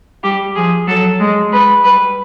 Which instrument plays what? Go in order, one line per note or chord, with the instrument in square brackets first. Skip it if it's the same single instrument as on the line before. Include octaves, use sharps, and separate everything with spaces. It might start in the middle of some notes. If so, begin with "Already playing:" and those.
[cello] G3 [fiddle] G4
[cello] F3 [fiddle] G#4
[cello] F#3 [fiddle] A4
[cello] G#3
[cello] G#3 [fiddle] B4
[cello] G3 [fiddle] B4